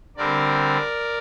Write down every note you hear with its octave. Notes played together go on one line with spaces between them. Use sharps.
D3 G3 C4 A#4 D5